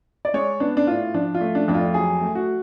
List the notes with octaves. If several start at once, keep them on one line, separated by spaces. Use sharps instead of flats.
D5
G#3 C#5
B3 D4
D4
A2 F4
F3 D4
F4
A3
D4
F2 D4
F4
F#3 G#4
A3
F#4